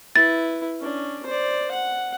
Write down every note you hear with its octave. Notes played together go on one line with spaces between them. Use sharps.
E4 B4 A6
C#4 D4
C5 D5
F#5